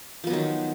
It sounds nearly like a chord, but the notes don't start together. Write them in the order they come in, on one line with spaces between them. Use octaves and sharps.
F3 B3 F#3 D#3